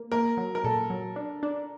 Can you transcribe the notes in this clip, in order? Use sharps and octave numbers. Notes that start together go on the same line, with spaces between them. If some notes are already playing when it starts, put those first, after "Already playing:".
Already playing: A#3
A#3 A#4
F#3
A#4
A#2 A4
F#3
D4
D4